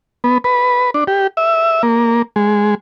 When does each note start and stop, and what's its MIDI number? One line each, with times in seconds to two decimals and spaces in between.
0.24 0.38 59
0.44 0.90 71
0.94 1.04 62
1.07 1.27 67
1.37 1.82 76
1.83 2.22 58
2.36 2.75 56